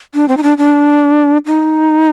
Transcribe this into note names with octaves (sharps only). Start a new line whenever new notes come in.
D4
C4
D#4
D4
D4
D#4